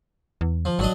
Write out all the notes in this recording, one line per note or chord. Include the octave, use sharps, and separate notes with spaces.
E2
F3
G#1 F#3 D4 D#5